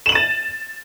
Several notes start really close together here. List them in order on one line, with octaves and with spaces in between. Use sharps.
E7 F#7 D#7 A6